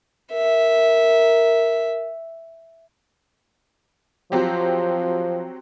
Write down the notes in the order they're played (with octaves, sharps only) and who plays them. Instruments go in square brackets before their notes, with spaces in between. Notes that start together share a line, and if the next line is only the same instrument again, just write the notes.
[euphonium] A#4 [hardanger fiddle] E5
[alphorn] F3 [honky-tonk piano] F#3 C4 G4